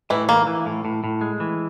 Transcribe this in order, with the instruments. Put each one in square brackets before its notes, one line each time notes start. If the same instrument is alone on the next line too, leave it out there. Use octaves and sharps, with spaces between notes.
[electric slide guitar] A2 [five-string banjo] E3 E4
[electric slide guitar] E3 [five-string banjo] A#3
[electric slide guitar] E3
A2
A2
A2
G#3
E3